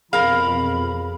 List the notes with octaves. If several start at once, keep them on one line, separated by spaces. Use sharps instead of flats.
F2 B2 G#4 A#4 F5 B5